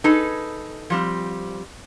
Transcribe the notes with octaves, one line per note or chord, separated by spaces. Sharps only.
D#4 G#4 A4 B4
F3 G3 C4